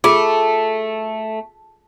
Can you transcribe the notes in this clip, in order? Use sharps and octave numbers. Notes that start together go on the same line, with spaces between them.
A3 F4 G#4